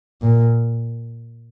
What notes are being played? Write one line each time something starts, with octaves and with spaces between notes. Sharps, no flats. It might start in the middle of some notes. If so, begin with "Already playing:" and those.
A#2